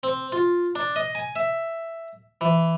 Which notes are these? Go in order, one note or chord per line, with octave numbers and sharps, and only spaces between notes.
C4
F4
D4
D#5
G#5
E5
E3